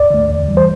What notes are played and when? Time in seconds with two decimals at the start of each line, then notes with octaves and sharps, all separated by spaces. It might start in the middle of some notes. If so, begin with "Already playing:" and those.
Already playing: D2 D5
0.10 D3 A3
0.30 E2
0.48 E3 G3
0.57 C5